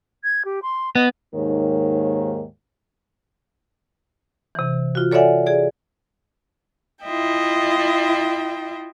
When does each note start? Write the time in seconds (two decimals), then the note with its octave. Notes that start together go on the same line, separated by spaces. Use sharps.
0.24 G#6
0.45 G4
0.62 C6
0.95 B3 D#5
1.34 D#2 G#2 D#3 A#3 C#5
4.55 C3 E3
4.95 F4 F#4
5.11 A4 C#5 D5 E5 F#5 G#5
5.46 G#4 D5
7.04 E4 F4 D#5 E5 G5